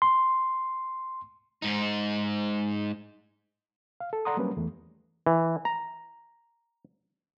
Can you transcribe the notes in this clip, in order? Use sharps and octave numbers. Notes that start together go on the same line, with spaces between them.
C6
G#2 D#4
F5
A4
A4 D5 F#5 A#5 C6 D#6
F#3 G3 A#3 C4 C#4 B4
E2 A3
E3
A#5